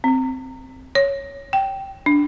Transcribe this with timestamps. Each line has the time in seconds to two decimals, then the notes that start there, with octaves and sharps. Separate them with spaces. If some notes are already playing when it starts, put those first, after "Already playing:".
0.04 C4
0.95 C#5
1.53 G5
2.06 D4